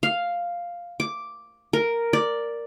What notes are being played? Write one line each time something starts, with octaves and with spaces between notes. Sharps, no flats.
F5
D6
A#4
D5